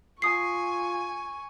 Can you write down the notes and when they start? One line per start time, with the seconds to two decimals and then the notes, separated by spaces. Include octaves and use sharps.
0.22 F4 G#5 C#6 D#6 C7